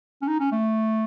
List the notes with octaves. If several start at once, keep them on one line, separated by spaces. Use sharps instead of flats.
C#4
D#4
C#4
A3